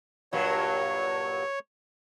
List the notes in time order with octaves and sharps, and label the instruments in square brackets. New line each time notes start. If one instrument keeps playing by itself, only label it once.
[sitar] G2 A#2 F#3 [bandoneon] C#5